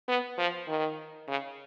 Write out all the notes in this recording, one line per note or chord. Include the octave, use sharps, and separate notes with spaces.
B3
F3
D#3
C#3